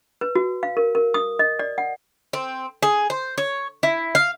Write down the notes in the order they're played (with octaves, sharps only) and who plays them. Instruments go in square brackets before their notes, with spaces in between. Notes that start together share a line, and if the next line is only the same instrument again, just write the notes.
[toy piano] B4
F#4
F5
A#4
A#4
D#6
D#5
D5
F#5
[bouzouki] C4
G#4
C5
C#5
E4
F5